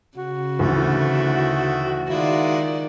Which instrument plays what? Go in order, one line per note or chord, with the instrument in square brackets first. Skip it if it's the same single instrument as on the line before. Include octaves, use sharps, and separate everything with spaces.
[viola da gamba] C#3 [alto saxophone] F#4
[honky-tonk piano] D2 E3 [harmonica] D#3 A3 E4
[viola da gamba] D#3 D5 [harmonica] G#3 E4 F4